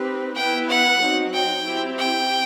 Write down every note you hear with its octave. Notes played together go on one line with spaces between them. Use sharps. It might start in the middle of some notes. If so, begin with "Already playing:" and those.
Already playing: C4 D#4 G4 B4
B3 E4 B4 G5
F#5
F#3 C4 D#4
G5
C4 E4 G4
G5